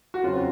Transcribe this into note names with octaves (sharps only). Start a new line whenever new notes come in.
F#4
F#2 C#3 F#3 C4 F4